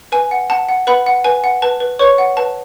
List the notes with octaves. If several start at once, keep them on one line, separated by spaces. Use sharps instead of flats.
B4 G#5
F#5
F#5 A5
F#5
B4 F#5 B5
F#5
B4 G#5
F#5
B4 A5
B4
B4 C#5 C#6
F#5
B4 A5